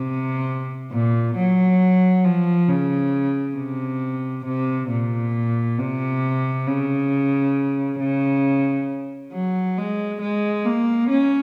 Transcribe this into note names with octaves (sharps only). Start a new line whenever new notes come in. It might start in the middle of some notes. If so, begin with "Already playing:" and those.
Already playing: C3
A#2
F#3
F3
C#3
C3
C3
A#2
C3
C#3
C#3
F#3
G#3
G#3
A#3
C#4